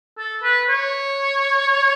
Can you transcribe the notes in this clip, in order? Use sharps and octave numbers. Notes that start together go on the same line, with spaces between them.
A4
B4
C#5